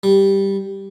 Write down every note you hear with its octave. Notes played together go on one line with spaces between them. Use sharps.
G3